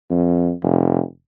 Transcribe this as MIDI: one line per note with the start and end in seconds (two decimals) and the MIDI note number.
0.10 0.52 41
0.63 1.01 29